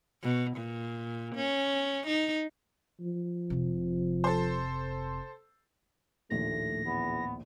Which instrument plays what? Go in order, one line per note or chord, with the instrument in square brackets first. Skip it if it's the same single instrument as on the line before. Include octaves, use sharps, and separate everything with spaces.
[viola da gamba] B2
A#2
C#4
D#4
[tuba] F3
[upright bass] F1 C3
[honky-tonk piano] A4 C5
[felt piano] A#1 D#2 A2 [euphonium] A3 [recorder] A#6
[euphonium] E2 [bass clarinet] B3